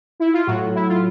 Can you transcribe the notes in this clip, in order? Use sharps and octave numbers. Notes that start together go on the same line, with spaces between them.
E4
F4
A2 F#3 F#4
E4
F4